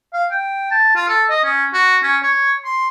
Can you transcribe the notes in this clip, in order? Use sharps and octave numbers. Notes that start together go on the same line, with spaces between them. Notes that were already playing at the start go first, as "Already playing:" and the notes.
F5
G5
A5
F4
A4
D#5
C#4
F#4
C#4
C#5
C6